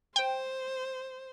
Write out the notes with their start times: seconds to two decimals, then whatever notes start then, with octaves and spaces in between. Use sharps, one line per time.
0.16 C5 G5